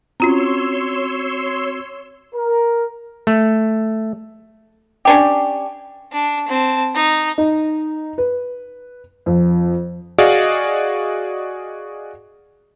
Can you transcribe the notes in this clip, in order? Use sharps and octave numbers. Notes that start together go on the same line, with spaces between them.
C4 C#4 F4 F#4 C#5 A#5 C6 E6
A#4
A3
C#4 D4 G4
D4
C4 A5
D#4
D#4
B4
F2
F#4 G#4 D5 D#5 F5